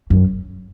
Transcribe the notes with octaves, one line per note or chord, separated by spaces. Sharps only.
F#2